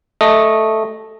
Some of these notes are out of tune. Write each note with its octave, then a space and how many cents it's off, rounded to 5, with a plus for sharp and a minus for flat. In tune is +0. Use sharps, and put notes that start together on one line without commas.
A3 +0 D#5 +0